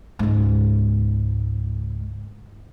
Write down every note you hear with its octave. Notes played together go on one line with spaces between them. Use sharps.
C#2 G#2